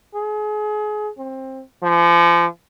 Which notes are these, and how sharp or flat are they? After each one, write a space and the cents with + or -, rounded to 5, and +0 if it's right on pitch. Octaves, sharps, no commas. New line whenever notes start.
G#4 +30
C4 +20
F3 -35